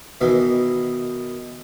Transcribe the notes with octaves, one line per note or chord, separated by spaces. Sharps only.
B2 D#3 E3